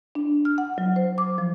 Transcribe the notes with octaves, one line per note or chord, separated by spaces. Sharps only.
D4
F6
F#5
F#3
C5
D6
F3